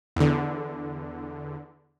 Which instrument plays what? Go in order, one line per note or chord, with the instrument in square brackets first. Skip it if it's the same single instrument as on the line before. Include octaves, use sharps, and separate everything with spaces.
[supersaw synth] E2 D3